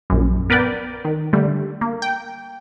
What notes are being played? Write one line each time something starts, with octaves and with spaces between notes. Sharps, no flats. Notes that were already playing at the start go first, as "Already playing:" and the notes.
A#1 F#2
B3 A#4 B4 D5 G5
D#3
D3 G3 A3
A#3
G5